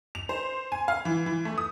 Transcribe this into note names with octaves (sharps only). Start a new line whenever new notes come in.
F7
C5
G#5
F5
E3
E3
A3
D#6